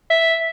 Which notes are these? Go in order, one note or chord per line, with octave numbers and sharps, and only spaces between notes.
E5